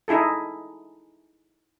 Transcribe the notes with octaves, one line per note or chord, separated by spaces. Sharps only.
D#4 E4 G#4 A4